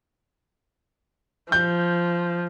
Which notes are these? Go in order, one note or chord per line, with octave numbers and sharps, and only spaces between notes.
F3 G6